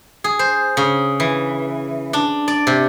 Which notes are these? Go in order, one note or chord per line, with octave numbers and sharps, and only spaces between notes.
G#4
C5
C#3
E3
D4
D5
C3